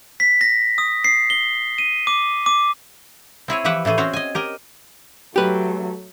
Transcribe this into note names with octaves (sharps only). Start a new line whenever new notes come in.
B6
A#6
D#6
C7
G7
D#7
D6
D6
C4 E4 G#4 C#5
E3 F3 G4 B4 E5 F#5
A2 E3 A3 G#4
C4 C#4 F#4 C5 C#5
D#5 G#5
G4 A#4 D#5
F#3 A3 G4 B4